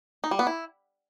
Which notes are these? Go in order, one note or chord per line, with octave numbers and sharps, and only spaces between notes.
D#4
G3
B3
E4